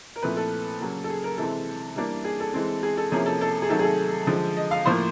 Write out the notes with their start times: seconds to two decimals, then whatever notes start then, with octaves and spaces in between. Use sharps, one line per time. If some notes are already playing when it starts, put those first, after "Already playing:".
0.16 A#4
0.22 A#2 F3 A3 C4 E4 B4
0.37 A4
0.81 C#3 F#3 A#3
1.04 A4
1.10 G#4
1.24 A#4
1.38 C3 E3 G#3 C4 A4
1.96 E3 G3 A#3 D4
2.24 G#4
2.40 A4
2.53 E3 G#3 C4
2.83 G#4
2.97 A4
3.11 C3 F3 A#3 C#4 E4 G#4
3.26 A4
3.41 A4
3.62 G#4
3.69 C3 D#3 F#3 A3 A4
3.79 G#4
3.84 A4
4.27 D3 F3 G#3
4.57 D#5
4.71 F5
4.85 A2 F3 A#3 C5